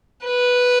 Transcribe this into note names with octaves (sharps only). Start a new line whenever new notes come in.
B4